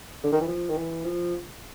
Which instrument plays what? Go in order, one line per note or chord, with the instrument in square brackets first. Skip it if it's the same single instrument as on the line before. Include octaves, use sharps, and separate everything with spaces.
[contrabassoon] D3
D#3
E3
F3
D#3
E3
F3